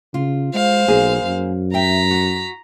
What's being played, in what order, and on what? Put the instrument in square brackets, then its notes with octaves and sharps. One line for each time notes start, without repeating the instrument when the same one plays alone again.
[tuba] C#3 [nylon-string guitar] F4
[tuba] G#3 [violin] C5 F5
[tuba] B1 [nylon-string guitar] A#3 G#4
[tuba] F#2
[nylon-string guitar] E5 G5 [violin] A#5 B6
[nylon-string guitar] F#4